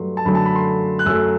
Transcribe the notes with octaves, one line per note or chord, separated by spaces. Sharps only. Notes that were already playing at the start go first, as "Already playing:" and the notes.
Already playing: G2 F#3 A3 C6
A5
F#2 D3 F#3 A3 B5
A5
B5
C6
F#6
F#2 F#3 A3 E6